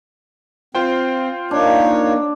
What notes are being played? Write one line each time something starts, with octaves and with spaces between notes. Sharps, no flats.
C4 F4 C5 G5
A#3 D4 D#4 C#5